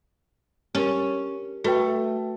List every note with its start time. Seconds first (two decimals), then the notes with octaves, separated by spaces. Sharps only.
0.75 C#4 G4 A#4
1.64 A3 F#4 B4 G5